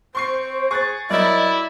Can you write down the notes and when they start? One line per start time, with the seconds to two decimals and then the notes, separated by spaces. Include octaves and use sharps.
0.15 C4 C5 C6 C#6 C7
0.71 G#4 C#6 F#6 A6
1.10 F#3 E4 A#4 D5 D#5